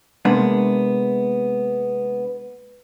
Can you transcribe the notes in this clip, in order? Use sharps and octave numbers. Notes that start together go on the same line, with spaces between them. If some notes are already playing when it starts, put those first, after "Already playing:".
C3 G#3 A#3 B3 D4